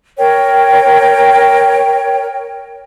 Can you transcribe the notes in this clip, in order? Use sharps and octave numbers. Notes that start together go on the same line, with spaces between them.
A#4 C#5 G5